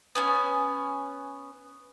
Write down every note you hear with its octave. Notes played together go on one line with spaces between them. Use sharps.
B3 C#4 G#5